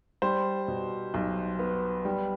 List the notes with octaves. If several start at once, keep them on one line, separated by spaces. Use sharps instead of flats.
G3 C5
B2
B1
B3
G3